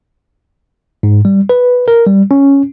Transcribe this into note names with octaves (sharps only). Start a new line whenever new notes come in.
G#2
G3
B4
A#4
G3
C#4